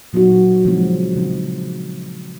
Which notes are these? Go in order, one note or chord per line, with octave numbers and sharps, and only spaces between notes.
A#2 F#3 B3 D#4 F#4
C#3 F3 G#3 C4 D#4
C#3 F3 G#3 C4 D#4